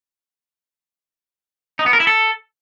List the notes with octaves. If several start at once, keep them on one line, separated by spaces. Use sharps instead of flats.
D#4
B3
A#4
E4
A4